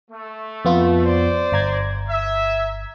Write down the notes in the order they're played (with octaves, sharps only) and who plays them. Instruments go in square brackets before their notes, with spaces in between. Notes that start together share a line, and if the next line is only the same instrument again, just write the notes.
[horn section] A3
[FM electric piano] F2 B3 F4
[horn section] C5 D5
[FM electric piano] G1 A#5 G#6
[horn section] E5